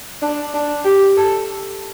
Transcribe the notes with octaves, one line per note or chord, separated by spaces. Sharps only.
D4
D4
G4
A4